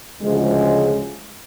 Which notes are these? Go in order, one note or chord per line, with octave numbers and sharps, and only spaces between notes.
D2 C#3 F3 G#3